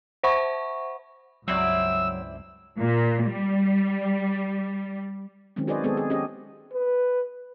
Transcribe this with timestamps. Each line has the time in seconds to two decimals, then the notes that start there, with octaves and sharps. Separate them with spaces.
0.23 C5 E5 F#5 B5 C#6
1.48 C#2 G2 F#3 C4 E4 D5 E6
2.78 A#2
3.25 G3
5.56 D#3 F#3 G#3 C4 C#4
5.67 F#4 G#4 B4 C5 D5 D#5
5.83 D#3 G#3 B3 C4 G#4 A4
5.97 G#4
6.10 C#4 G4 G#4 D#5
6.73 B4